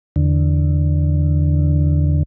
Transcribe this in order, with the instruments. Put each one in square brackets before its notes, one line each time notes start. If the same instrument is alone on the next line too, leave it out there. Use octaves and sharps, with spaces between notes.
[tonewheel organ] E2 D3